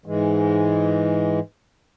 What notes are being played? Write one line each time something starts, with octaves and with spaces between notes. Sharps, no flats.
G#2 E3 G#3